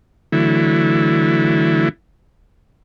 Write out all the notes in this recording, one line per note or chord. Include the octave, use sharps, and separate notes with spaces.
D3 E3 F#3 A3 E4